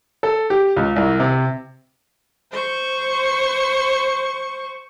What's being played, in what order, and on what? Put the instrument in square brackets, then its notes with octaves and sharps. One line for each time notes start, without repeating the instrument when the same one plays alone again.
[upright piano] A4
G4
C#2
C2
C3
[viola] C5 C#6